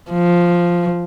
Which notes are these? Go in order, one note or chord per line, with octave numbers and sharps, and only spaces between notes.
F3